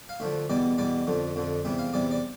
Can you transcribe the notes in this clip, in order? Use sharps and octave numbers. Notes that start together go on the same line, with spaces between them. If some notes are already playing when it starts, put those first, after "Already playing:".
F5
D2 D3 F3 E5
E2 B2 G3 D5
E2 B2 G3 D5
F2 D3 F3
F2 D3 F3
E2 C3 G3 E5
F5
E2 C3 G3 D5
D5